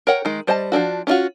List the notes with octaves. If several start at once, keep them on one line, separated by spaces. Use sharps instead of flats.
A#4 C#5 F#5 G5
D#3 G#3
G3 C5 D#5 F#5 A5
F3 G#3 D4 F#4
C#4 D4 F4 F#4